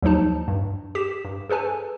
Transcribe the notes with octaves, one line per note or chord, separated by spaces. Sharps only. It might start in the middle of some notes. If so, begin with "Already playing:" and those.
D#2 F3 F#3 D#4 A5
G2
G4 B6 E7
G2
G#4 A4 B4 G#5 A5